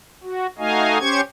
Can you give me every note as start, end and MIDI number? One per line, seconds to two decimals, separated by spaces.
0.23 0.47 66
0.58 0.98 57
0.58 0.98 63
0.58 0.98 66
0.58 0.98 75
0.58 0.98 77
0.58 0.98 80
0.99 1.21 61
0.99 1.21 67
0.99 1.21 72
0.99 1.21 85
0.99 1.21 92